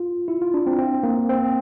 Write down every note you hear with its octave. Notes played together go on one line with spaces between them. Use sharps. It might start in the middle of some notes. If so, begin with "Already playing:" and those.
Already playing: F4
E4
F4
D4
C4
C4
A#3
C4